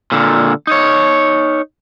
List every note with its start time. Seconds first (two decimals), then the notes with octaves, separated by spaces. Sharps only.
0.12 A#2 D3
0.67 D#4 C#5